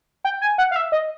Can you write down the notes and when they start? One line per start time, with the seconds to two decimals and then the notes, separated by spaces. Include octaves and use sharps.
0.25 G5
0.41 G#5
0.58 F#5
0.71 F5
0.76 E5
0.92 D#5